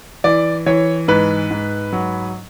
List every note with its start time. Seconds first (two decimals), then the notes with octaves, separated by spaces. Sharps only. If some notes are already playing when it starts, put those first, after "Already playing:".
0.24 E3 D5
0.66 E3 C#5
1.08 G#2 B4
1.51 G#2
1.93 F#3